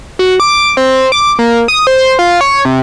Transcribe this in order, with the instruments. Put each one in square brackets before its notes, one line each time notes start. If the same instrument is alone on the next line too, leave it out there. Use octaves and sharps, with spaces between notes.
[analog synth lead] F#4
D6
C4
D6
A#3
D#6
C5
F4
C#5
C3